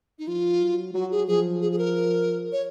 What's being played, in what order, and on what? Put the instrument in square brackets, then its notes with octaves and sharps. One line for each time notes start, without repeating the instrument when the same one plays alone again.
[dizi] D#4
[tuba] F3 [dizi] F4
[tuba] F#3
[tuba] F#3 [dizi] F#4
[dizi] G#4
[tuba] F3 [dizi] G#4
[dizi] G#4
G#4
A#4
C#5